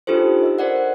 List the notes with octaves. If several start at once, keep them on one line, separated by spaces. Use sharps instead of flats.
D4 D#4 F4 G4 A4 C5
D#5 E6
A#4 C5 D5 F#5